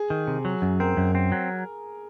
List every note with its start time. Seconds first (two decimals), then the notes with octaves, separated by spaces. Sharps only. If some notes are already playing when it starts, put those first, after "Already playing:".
Already playing: G#4
0.10 D#3
0.28 C3
0.45 F#3
0.62 F#2
0.80 C4 A#4
0.97 F#2
1.15 C4
1.32 F#3